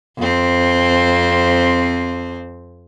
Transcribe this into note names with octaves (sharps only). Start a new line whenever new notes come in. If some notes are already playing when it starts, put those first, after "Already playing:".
F2 C4